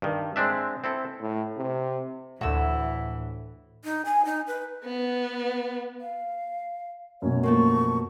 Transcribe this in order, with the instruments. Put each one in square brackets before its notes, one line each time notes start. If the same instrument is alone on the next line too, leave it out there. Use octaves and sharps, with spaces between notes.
[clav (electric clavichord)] G2 D#3
G#3 C4 D4 E5
C4 E4 A4
[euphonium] A2
C3
[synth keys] D2 A2 [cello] E3 [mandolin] F#4 E6
[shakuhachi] D#4
G#5
D#4
B4
[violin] B3
[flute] F5
[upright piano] F#2 B2 [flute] C#5
[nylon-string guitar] F3 A3 A#3 [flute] C#6